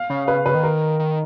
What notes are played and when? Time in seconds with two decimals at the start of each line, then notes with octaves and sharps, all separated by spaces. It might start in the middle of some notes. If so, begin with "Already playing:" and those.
Already playing: F5
0.10 C#3
0.27 C#3 B4
0.45 C#3 B4
0.55 D#3
0.63 A#4
0.99 D#3